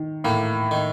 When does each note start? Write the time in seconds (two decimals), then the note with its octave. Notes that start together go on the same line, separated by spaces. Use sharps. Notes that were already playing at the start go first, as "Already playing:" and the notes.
Already playing: D#3
0.24 A2 A#3
0.71 D#3